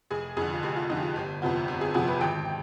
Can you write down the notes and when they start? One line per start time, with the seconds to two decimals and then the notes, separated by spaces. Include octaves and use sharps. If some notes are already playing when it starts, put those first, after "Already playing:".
0.11 F1 G#4
0.37 F2 D3 G#4
0.53 F4
0.63 F1 G4
0.76 F4
0.90 F2 D3 D#4
0.97 G4
1.03 F4
1.16 G1 G4
1.42 F2 C3 F3 B3
1.68 G1
1.81 G#4
1.94 F2 C3 F3 B3 G#4
2.08 B4
2.21 G#1 G5